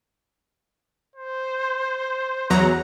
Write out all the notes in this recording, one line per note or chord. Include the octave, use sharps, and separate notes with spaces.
C5
E2 F#3 F#5 A#5